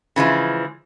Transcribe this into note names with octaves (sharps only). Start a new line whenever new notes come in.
C#3 E3 F3 G#3